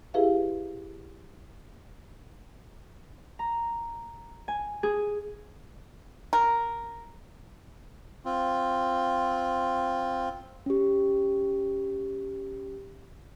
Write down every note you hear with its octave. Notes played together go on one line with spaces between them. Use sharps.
E4 G4 G#4 B4 E5 F5
A#5
G#5
G#4
A#4
C4 F4
C#4 G4